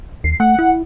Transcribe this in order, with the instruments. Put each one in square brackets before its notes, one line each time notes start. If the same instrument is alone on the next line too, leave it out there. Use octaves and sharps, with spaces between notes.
[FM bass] D#2 [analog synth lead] C7
[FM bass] A3 [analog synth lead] F#5
[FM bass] E4